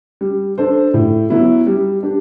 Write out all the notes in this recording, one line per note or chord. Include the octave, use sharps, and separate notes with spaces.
G3
D4 A4 C5
A2
F#3 B3 E4
G3
D4 G4